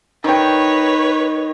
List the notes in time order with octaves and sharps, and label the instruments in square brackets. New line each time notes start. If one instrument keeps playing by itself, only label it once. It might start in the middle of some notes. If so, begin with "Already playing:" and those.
[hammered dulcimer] D#3 G5 [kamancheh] B4 C#5